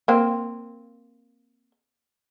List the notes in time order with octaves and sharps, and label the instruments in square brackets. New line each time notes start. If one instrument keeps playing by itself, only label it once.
[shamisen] A#3 C4